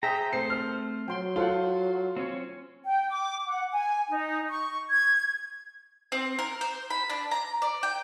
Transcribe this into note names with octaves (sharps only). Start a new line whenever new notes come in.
G#4 C5 E5 G5 A#5
A3 C4 A4 C5 C7
F6
F#3 G5 C6
F4 A4 C5 F#5 C6
C4 C#4 C#5
G5
D6
F#5
G#5
D#4
C#6
G#6
C4
A#4
C5
B5
D4
A#5
D5
G5